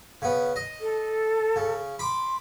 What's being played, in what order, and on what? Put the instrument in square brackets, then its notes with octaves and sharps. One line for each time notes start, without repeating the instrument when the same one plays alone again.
[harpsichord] C#3 B3
D#5
[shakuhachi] A4
[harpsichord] C#3
[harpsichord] B5 D6 [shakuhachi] C6